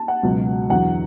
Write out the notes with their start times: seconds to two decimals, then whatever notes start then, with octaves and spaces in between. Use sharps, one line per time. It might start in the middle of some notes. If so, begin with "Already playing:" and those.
Already playing: A5
0.08 F#5
0.23 C#2 B2 F#3
0.70 E2 D3 F#3 F#5